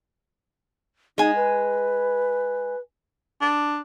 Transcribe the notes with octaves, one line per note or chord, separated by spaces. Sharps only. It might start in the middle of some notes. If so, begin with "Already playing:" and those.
G#3 D#4 G#5
B4
D4